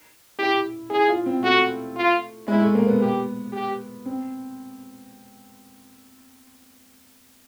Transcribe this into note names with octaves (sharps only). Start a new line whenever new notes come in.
E4 G4
E4 G#4
F4
C4
A3 F#4
F4
G#3 E4
A3
A#3
B3
G4
G4
C4